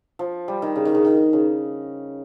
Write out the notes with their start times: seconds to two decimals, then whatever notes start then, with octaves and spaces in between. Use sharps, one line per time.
0.19 F3
0.48 G3
0.62 D#3
0.76 C#3
0.85 D#3
0.95 C#3
1.05 D#3
1.33 C#3